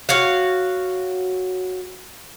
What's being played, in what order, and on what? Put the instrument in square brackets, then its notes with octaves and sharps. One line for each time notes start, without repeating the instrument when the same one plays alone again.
[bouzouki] F#4 C#5 F5